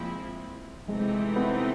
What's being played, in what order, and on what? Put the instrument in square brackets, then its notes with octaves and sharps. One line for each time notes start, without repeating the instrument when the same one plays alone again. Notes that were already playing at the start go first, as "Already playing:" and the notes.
Already playing: [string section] A#2 F3 G#3 C4 E4
[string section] C3 E3 A3 C4 D#4 [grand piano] G#3
[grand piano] B3